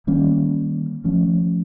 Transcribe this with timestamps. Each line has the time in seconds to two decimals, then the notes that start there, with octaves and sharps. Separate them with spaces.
0.07 D#3 G3 A#3 C#4
1.04 F3 A3 C#4